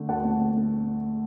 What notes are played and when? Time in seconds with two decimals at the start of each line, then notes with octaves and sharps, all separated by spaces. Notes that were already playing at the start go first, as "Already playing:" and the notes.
Already playing: D3 A3
0.09 D2 F#5 A5
0.24 A3
0.41 A3
0.57 A3